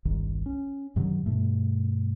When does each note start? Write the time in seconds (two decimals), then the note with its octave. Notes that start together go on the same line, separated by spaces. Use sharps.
0.05 G1 C2 D#3
0.46 C#4
0.96 F#2 C3 D#3 F#3
1.26 G2 B2 A3